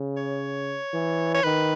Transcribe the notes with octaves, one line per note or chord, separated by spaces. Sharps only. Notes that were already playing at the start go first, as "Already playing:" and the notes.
Already playing: C#3
C#5
E3
C#5
D#3 B4